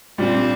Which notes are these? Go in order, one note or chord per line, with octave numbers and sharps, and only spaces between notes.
A#2 G3 C4 D4